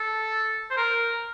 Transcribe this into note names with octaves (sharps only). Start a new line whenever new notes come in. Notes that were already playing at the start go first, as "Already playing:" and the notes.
Already playing: A4
C5
A#4